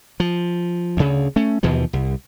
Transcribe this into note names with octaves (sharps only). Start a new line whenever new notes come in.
F3
D2 C#3
A3 C#4
D#2 B2 E3 F3
C2